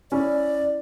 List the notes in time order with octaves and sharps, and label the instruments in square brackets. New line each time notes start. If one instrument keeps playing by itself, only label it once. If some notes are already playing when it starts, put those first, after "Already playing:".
[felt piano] C#4 E4 [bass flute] D5